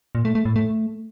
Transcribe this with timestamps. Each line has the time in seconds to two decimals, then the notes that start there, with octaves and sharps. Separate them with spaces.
0.15 A#2
0.25 A3
0.35 A3
0.45 A2
0.56 A3